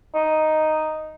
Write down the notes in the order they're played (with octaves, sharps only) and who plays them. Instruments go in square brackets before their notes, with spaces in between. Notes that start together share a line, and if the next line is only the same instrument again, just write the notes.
[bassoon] D#4